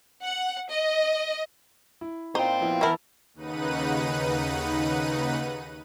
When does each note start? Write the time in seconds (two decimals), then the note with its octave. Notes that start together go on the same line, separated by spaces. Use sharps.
0.23 F#5
0.69 D#5
2.01 E4
2.35 A#2 C4 D#4 F4 C5 G5
2.61 F3 B3 E4
2.81 E3 B3 E4 A#4 A5 E6
3.34 D#2 C#3 D#4 B4 F#5 D#7